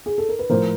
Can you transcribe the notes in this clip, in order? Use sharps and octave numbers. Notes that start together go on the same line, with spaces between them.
G#4
A4
A#4
B4
A2 F3 A#4 C5